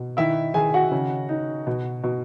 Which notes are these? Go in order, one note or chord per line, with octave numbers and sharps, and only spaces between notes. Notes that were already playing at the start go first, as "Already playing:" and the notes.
Already playing: B2
D#3 E4 E5
D#3 G#4 G#5
F#4 F#5
C#3
D#4
B2
B2